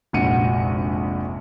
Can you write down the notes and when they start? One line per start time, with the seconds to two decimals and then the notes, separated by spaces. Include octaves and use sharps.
0.13 F1 A#1 G#2 F#4 C#7 D#7